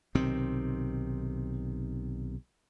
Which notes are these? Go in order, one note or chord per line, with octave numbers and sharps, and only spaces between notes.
B1 C3 D#3 C4